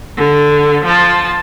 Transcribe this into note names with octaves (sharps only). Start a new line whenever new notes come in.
D3
F3 A5